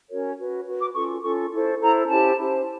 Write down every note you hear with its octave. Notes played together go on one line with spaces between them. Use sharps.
C#4 F#4 A#4 C#5
F#4 B4
F#4 B4
D6
C#4 F4 A4 C#6
C#4 F4 A4 C#6
E4 A4 C5
E4 A4 C5 A#5
C#4 E4 G4 C5 A5
C#4 E4 G4 C5